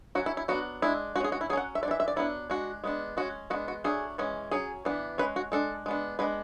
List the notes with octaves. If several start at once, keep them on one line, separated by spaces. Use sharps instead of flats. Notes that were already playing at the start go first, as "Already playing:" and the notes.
F#3 C#4 F#4
E4
E4
F#3 B3 D4 F#4
G#3 D4 E4
G#3 C#4 F#4 G#4
F#4
E4
F#3 C#4 G#4 F#5
E5
A3 D4 D5
E3 E5
E5
D5
F#3 B3 D4 E4
G#3 D4 F#4
G#3 B3 D4
G#3 C#4 F#4
G#3 B3 D4 F#4
F#4
F#3 A3 D4 G#4
E3 G#3 C#4
F#3 C#4 G#4
E3 B3 D4
G#3 C#4 B4
F#4
G#3 D4 A4
G#3 B3 D4
G#3 B3 D4 B4